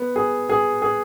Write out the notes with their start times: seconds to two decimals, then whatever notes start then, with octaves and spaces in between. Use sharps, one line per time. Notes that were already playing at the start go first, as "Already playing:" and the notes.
Already playing: B3
0.16 G#4
0.49 G#4
0.82 G#4